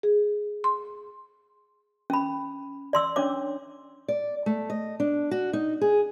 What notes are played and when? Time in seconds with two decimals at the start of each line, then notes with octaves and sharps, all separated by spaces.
0.03 G#4
0.64 C6
2.10 C#4 B5
2.93 D5 C6 E6
3.16 C#4 D4 C#5 D6
4.08 D5
4.46 A3
4.70 D#5
5.00 D4
5.31 F#4
5.53 D#4
5.81 G#4